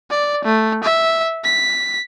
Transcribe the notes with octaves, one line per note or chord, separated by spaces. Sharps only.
D5
A3
E5
B6